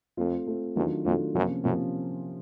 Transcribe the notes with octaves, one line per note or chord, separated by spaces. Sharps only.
F2 A3 C4 F4
A3 C4 F4
E2 D#3 F#3 A3 D4 F4
F2 D#3 F#3 A3 D4 F4
F#2 C3 F3 A#3 C#4 F4
F#2 C3 F3 A#3 C#4 F4